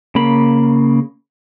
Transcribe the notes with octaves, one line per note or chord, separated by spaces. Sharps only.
C#3 A#3 B5